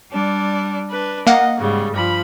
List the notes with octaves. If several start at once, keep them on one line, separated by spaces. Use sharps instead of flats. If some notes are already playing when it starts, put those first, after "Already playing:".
G3 D4
D4 B4
A#3 D#5 F5 F#5
G#2 C#3 G3
G2 F3 B5